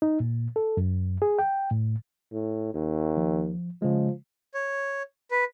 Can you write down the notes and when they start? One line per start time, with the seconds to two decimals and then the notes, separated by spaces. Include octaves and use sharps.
0.02 D#4
0.20 A#2
0.56 A4
0.77 F#2
1.22 G#4
1.39 G5
1.71 A2
2.32 A2
2.74 D#2
3.17 F3
3.82 C#3 F3 G#3
4.54 C#5
5.31 B4